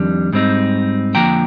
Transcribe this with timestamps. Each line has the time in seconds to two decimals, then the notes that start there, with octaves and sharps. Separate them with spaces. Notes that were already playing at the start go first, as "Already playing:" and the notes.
Already playing: F2 D#3 G3 D4
0.33 G#2 G3 C4 D#4
1.15 F2 D3 F3 A#3 G5 A#5